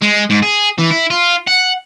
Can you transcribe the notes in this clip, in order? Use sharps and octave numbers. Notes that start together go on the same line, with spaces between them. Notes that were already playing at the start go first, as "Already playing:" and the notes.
G#3
G#2
G#4
E3
E4
F4
F#5